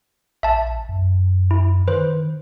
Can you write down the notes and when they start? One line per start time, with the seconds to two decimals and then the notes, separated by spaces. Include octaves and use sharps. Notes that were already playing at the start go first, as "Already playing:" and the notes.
0.43 A#1 E5 A5
0.89 F#2
1.51 E4
1.88 D#3 B4 C5